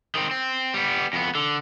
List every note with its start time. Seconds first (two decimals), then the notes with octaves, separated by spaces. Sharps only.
0.15 D#3 C4
0.31 C4
0.74 G3 B3
1.13 F2 B3
1.35 D3